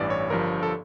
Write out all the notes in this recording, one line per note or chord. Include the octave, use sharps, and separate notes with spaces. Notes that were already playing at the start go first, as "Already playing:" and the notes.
Already playing: A1 G2 E3 D5
C#5
G1 G2 F3 A#4
A4